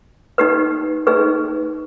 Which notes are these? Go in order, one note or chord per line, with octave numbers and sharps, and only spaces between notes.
D#4 G4 B4
D#4 G#4 B4